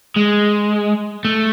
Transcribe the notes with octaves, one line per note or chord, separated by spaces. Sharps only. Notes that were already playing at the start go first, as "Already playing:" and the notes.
G#3
A3